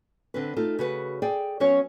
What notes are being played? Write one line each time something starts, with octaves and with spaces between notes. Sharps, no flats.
D3 C4 B4
A3 D#4 F4 A4
C#3 F#4 B4
G#4 D5 G5
F#3 B3 C#4 F#4 C#5